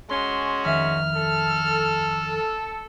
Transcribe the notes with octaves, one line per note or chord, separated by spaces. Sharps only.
G#3 C#4 F#4 C6
F2 D#3 E5 F6
A4